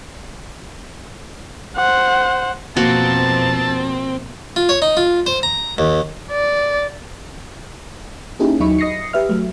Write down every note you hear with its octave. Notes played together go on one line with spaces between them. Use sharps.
C5 F#5
F2 B2 F3 A#3 C4 F#4 A5
F4
C#5
D#4
F4
C5
A#5
D#2
D5
A#3 C#4 D#4 E4 G4 G#4
D#2 F#3 D#4 E5 B5 C#6
D#5 D#6 A#6 C7 C#7
G4 B4 E5 F6
F#3 A3